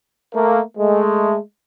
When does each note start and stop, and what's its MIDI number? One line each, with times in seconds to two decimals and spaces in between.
0.33 0.60 57
0.33 0.60 58
0.76 1.36 56
0.76 1.36 57